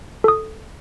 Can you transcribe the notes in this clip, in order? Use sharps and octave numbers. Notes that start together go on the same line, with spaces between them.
A4 D#6